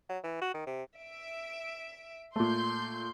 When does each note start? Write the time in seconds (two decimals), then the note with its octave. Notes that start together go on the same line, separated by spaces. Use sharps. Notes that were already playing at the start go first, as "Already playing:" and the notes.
0.09 F#3
0.24 E3
0.42 F#4
0.54 D#3
0.67 C3
1.00 E5 D7
2.36 A#2 A3 C6 G6